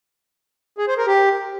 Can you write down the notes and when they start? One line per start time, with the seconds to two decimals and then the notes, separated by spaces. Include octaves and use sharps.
0.78 G#4
0.88 C5
0.97 A#4
1.07 G4